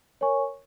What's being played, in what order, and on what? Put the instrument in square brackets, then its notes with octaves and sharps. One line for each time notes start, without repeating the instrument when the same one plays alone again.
[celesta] A#4 C#5 G#5 C#6